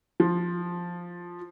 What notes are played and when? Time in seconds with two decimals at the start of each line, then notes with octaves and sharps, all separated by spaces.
0.20 F3